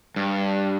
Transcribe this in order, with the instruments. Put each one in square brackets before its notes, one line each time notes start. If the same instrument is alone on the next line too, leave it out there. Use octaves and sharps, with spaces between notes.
[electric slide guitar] G2